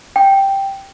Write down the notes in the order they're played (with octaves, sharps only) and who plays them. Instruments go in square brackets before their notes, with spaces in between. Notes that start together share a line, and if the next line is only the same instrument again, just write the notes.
[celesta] G5